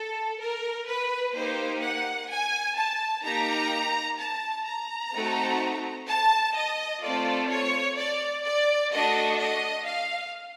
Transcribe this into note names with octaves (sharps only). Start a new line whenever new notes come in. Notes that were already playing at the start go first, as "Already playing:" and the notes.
Already playing: A4
A#4
B4
A#3 D#4 G4 C5
F#5
G#5
A5
A#3 D#4 G4 A#5
A5
A#5
A3 C4 D#4 F#4 A4
A5
D#5
A3 C4 F4 A4 D5
C#5
D5
D5
A3 D4 F#4 A4 D#5
D#5
F5